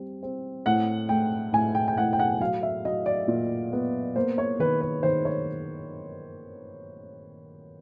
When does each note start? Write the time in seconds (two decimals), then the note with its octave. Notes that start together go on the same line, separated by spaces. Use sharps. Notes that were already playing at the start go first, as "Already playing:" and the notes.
Already playing: G3 C4
0.23 C4
0.66 A2 F#5
1.09 A3 G5
1.53 A2 G#5
1.75 G5
1.88 G5
1.98 A2 F#5
2.13 G5
2.19 F#5
2.40 F#3 F5
2.63 E5
2.85 F#3 D#5
3.06 D5
3.28 A#2
3.72 B3
4.16 A#3 C5
4.38 C#5
4.59 D#3 B4
4.81 B4
5.03 D#3 C5
5.25 C#5